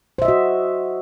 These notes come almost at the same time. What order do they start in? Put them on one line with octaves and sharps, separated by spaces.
C5 E5 D#5 F#4